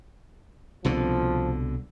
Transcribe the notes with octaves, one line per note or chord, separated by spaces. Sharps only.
C2 B2 D3 F3